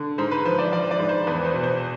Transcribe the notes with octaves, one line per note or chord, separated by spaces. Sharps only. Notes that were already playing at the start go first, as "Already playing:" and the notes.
Already playing: D3
G#2 C5
B4
F3 C5
D5
F3 D5
D5
G#2
C5
E2 B4
C5
B2
C5